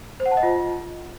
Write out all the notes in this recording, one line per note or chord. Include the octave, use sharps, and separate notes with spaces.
C5
F#5
A5
D#5
F4